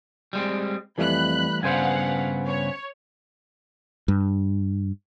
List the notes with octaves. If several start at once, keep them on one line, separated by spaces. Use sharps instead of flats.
G3 G#3 C4
F2 E3 G3 A3 B5 F#6
G2 C#3 B3 C5 F5 F#5 G#5 G#6
C#5
G2